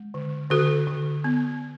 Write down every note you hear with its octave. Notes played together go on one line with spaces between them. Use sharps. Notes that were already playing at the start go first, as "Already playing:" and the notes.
Already playing: G#3
D3
D3 F#4 A4
D3
B3